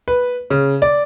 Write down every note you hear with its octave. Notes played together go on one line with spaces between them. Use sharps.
B4
C#3
D5